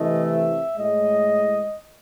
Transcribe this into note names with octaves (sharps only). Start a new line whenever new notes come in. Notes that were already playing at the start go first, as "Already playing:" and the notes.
Already playing: C3 E3 A3 D#5
E5
A2 G#3 D#5